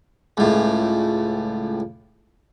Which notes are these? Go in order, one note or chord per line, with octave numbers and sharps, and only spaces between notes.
C#2 A2